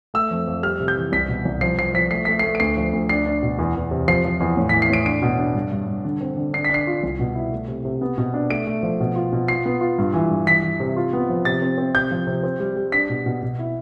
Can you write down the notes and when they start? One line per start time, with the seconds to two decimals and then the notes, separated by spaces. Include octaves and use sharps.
0.14 A3 E6
0.30 F2
0.47 F2
0.63 G3 F6
0.80 C3
0.88 G6
0.97 E3
1.12 C2 B6
1.28 B2
1.45 C2
1.61 F3 C7
1.78 F3 C7
1.94 F3 B6
2.11 A3 C7
2.25 A3 B6
2.39 A3 C7
2.55 D7
2.60 D2 C7
2.77 F3
2.93 D2
3.09 D4 C7
3.26 D4
3.43 B2
3.58 E2
3.75 E2
3.91 C3
4.08 F3 C7
4.24 F3
4.40 E2
4.57 A2
4.69 B6
4.73 E3
4.82 C7
4.90 A2 D7
5.06 D4 D7
5.22 B2
5.39 D4
5.55 G2
5.72 G2
5.88 G2
6.05 D3
6.21 C4
6.37 D3
6.53 D4 C7
6.64 B6
6.70 D4 C7
6.87 F4
7.03 C2
7.19 B2
7.35 E4
7.52 A3
7.68 C3
7.85 C3
8.01 B3
8.18 B2
8.34 D4
8.50 A3 D7
8.67 A3
8.83 F3
9.00 B2
9.16 F4
9.33 B2
9.48 F4 C7
9.66 B3
9.81 F4
9.98 G2
10.14 E3
10.30 G2
10.46 E3 B6
10.64 E3
10.80 C3
10.96 F4
11.13 B3
11.29 F3
11.45 C3 A6
11.62 C4
11.78 C4
11.95 C3 G6
12.11 F3
12.27 C3
12.43 C4
12.60 G3
12.76 G3
12.92 D4 B6
13.09 B2
13.26 B2
13.43 B2
13.59 E4